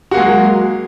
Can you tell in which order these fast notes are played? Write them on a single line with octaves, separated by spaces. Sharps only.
F#4 A#3 G#3 F#3